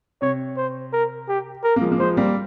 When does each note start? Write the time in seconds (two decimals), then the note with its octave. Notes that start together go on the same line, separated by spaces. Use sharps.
0.22 C3 C#5
0.57 C5
0.93 A#4
1.29 G4
1.64 A#4
1.76 A#3
1.81 F3 G#3
1.92 A#3
1.99 F3 G#3 C5
2.17 G3 A#3